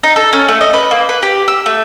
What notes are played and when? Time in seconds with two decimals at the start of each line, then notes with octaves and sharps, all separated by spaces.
0.03 D#4
0.16 A4
0.33 C#4
0.48 A3
0.61 D#5
0.73 B4
0.91 A#3
1.09 B4
1.23 G4
1.48 E6
1.66 A3